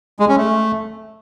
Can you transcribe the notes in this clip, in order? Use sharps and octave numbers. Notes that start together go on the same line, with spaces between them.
G#3
C#4
A3